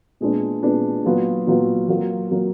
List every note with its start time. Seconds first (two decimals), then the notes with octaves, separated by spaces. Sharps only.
0.21 A#2 G#3 B3 D4
0.63 A#2 G#3 B3 D4
1.04 A#2 F#3 B3 F4
1.47 A#2 F#3 B3 F4
1.88 F#3 A#3 F4
2.30 F#3 A#3 F4